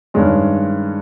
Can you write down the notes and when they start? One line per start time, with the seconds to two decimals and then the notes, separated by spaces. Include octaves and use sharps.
0.14 G2 D#3 G#3 C#4